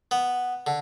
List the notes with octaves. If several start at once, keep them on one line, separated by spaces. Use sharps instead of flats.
B3
D3